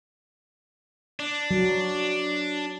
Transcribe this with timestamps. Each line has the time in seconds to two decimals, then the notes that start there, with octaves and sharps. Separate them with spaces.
1.20 D4
1.51 F#3